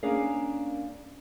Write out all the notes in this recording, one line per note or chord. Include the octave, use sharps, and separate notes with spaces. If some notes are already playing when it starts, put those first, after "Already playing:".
A#3 C#4 D4 G#4 A#4 F5